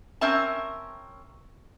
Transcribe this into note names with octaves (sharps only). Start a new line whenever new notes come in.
C4 C#4 A#4 E5 A5